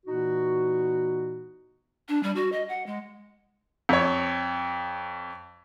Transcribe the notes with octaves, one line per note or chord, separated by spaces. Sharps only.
A#2 E3 B3 D#4 F#4
D4
G3
F#4
D#5
F#5
G#3
F2 C#5